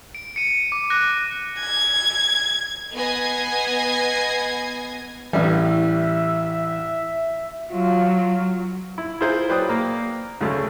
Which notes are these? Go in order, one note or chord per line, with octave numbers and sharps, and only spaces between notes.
D7
C#7 D#7
D6
D6 F#6 A#6
G#6
B3 D#5 G#5 G#6 A#6 C7
A1 E3 G3 E5
F#3 F4
E4
E4 F4 G#4 A#4 C5
F#3 B4 C5 D5 G5 D#6
A#3
D2 C#3 G#3 A3